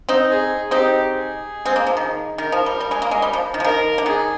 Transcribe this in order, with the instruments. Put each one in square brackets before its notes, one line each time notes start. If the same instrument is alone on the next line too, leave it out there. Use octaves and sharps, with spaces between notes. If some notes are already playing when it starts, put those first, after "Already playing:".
[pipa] C4 D#4
[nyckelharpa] G#4
[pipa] C4 D#4 [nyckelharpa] G4
[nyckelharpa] G#4
[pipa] G#3 C4
A#3
F3
D#3
[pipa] D#3 [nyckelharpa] A#4
[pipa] F3
G3
G3
G#3
A#3
G#3
G3
F3
D#3
F3
[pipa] D#3 [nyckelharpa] A#4
[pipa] D3
[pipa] D#3 [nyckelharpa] G#4